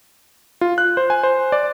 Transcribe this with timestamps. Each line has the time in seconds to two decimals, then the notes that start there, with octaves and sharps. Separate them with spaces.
0.61 F4
0.78 F#6
0.97 C5
1.10 G#5
1.23 C5
1.52 D5